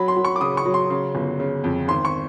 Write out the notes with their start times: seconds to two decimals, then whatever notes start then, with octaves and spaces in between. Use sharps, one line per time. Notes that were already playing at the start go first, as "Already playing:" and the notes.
Already playing: F#3 B5
0.08 C6
0.16 F#3
0.25 C#6
0.36 D6
0.41 C#3 D#6
0.57 C#6
0.65 F#3
0.74 C6
0.90 C#3
1.15 G1
1.40 C#3
1.64 F2
1.88 G#1 C6
2.05 C#6